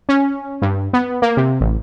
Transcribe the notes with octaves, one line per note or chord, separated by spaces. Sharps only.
C#4
G2
B3
A#3
C3
A1